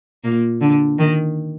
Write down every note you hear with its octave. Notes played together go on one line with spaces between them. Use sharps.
A#2 A#3
D3
D#3